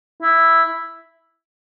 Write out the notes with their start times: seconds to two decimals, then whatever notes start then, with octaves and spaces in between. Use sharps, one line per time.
0.22 E4